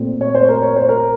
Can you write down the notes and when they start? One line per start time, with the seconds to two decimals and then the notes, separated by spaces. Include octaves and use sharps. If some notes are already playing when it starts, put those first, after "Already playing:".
Already playing: A#2 A3 C4
0.21 C#5
0.35 C5
0.49 A#4
0.62 C#5
0.76 C5
0.89 A#4